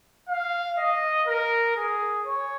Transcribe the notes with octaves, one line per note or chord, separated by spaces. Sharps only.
F5
D#5
A#4
G#4
C#5